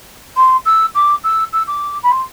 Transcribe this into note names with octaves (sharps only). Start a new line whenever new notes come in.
C6
E6
D6
E6
E6
D6
B5
C6